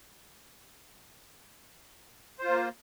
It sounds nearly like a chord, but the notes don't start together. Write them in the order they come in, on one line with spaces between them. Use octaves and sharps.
C5 F4 A#3